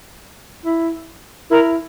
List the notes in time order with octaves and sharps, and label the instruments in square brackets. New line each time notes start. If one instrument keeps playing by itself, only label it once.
[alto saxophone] E4
[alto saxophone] E4 [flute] A#4